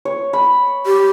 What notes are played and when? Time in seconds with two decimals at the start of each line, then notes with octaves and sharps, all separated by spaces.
0.05 C#5
0.33 B5
0.86 G4